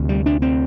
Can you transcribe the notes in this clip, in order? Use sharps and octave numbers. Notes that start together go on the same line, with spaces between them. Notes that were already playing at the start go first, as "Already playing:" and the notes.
Already playing: D2 C3
G3
D4
C4